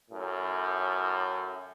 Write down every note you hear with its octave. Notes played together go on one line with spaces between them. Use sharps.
F#2 A2